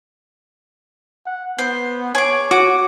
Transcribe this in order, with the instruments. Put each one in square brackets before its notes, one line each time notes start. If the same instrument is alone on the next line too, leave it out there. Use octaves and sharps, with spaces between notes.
[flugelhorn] F#5
[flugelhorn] B3 [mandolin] C5
[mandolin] G#4 D6 [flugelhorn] C#5
[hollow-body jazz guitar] F#4 [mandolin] D6